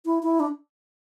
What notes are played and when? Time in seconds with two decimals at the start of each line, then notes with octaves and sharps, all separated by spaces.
0.06 E4
0.23 E4
0.40 D4